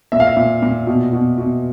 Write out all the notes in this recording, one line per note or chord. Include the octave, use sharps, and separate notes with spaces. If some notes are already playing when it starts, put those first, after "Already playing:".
A#2 E5
F5
E5
A#2
A#2
B2
B2
B2